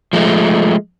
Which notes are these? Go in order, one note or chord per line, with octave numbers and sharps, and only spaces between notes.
F3 G#3 A3